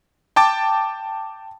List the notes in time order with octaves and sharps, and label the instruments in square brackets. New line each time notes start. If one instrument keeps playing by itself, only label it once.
[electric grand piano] G5 A5 D6 A6